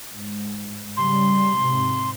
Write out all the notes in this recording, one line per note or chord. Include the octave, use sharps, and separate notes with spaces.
G#2
C#3 G3 C6
G#2 C3